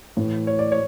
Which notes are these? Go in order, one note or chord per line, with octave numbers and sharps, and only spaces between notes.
A2 E3
C#5
D5
C#5